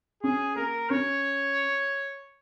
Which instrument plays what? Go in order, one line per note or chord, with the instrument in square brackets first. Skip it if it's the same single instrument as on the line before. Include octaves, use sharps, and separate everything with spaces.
[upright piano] C#4 [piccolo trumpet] G#4
[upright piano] A#3 [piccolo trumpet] A#4
[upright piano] C#4 [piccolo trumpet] C#5